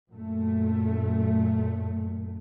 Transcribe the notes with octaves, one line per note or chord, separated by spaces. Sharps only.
F#2 A#2 A3